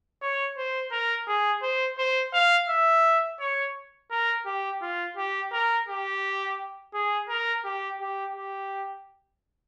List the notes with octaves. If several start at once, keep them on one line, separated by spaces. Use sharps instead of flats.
C#5
C5
A#4
G#4
C5
C5
F5
E5
C#5
A#4
G4
F4
G4
A#4
G4
G#4
A#4
G4
G4
G4